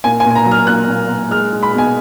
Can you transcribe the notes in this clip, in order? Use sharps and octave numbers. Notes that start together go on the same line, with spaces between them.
A#2 G#5
G#5
A#2
G#5
A#5
F#3
F6
A#2 F#6
A#2
A#2
G#3 F6
G#3
B5
B2 G#5